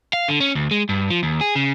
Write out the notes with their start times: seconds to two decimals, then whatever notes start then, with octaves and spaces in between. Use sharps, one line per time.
0.13 F5
0.28 D3
0.40 C#4
0.55 D2
0.71 G#3
0.89 G2
1.10 F3
1.23 D#2
1.41 G#4
1.55 C#3